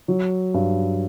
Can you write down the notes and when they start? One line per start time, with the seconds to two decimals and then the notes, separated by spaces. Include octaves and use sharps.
0.08 F#3
0.54 G2